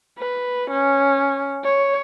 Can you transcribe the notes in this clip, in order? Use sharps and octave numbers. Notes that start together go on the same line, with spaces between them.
B4
C#4
C#5